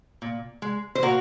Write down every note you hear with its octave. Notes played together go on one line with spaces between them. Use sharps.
A#2
G#3
C5
A#2 F#4 A#4